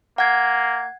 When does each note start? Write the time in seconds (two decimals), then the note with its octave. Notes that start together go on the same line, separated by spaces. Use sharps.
0.18 A#3 F#5 G#6